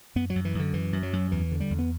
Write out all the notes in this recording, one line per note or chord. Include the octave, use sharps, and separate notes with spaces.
F#2 B3
F#3
F#2
E3
F#2 D3
F#2 E3
F#2
F#3
F#2
E2 E3
D3
G3
E2
B3